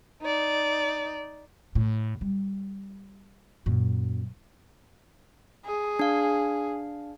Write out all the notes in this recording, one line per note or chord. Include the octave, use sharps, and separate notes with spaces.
D#4 D5
A2
G3
F#2 A#2
G#4
D4 F5